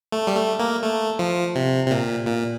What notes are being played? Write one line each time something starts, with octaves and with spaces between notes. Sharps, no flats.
A3
G3
A3
A#3
A3
F3
C3
C3
A#2
A#2